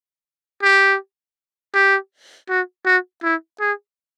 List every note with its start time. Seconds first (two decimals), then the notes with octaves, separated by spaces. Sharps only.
0.63 G4
1.74 G4
2.49 F#4
2.86 F#4
3.24 E4
3.61 G#4